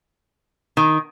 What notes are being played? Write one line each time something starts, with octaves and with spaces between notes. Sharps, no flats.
D#3